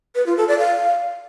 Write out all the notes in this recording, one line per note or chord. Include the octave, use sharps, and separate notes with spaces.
B4
F4
A4
D5
F5